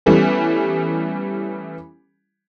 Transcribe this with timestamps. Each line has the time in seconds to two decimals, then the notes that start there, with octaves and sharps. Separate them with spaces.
0.06 E3 G3 A3 B3 C#4